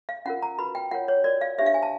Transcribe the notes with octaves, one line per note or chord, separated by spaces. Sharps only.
F5
C#4 F4 A#4 F#5
A#5
F#4 B4 B5
G5
F4 A#4 C#5 F#5
C#5
F#4 A#4 C#5 D5
F5
D4 G4 C5 E5
F5
G#5
A5